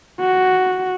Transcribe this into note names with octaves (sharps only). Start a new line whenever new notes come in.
F#4